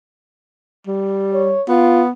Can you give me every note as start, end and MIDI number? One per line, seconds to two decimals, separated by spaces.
0.87 1.55 55
1.33 1.62 73
1.69 2.10 59
1.69 2.02 65